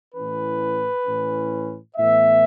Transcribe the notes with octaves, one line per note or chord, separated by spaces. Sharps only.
A2 E3 C#4 B4
A2 E3 C#4
A2 E3 B3 E5